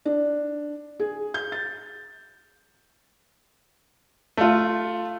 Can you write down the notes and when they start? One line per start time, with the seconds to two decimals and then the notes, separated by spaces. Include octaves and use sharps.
0.05 D4
1.00 G#4
1.34 G6
1.52 A6
4.37 A3 F4